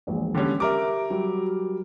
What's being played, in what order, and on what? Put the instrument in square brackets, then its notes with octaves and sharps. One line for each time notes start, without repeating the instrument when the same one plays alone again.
[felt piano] E1 A#1
[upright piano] D3 G3 C#4
[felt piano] G4 E5 [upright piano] A#4 D6
[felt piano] F#3 G3